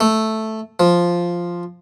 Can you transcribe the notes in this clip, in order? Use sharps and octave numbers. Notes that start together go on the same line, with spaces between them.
A3
F3